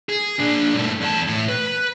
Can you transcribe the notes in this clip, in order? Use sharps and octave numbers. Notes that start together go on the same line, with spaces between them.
G#4
A#2 D4
G2 A3
E2 A5
A2
B4